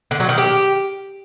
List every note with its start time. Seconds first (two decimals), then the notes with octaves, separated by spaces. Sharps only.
0.11 D3
0.20 F#3
0.29 D#3
0.38 G4